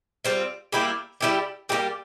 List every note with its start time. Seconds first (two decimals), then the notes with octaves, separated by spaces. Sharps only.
0.24 G3 C4 F4
0.72 G3 A#3 E4 G4
1.21 G3 A#3 E4 G4
1.69 G3 A#3 E4 G4